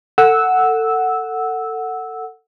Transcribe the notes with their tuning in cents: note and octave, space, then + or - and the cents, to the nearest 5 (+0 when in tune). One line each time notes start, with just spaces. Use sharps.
A4 +25 F#5 +0 E6 -10